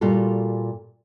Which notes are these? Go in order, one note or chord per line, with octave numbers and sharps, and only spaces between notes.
A#2 G3 F4 F#4 A4